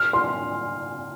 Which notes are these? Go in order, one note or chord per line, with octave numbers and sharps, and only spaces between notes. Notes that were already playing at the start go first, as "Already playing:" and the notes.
Already playing: F6
C6